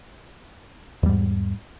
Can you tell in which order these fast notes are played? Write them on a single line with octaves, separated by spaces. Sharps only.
E2 G3 G#2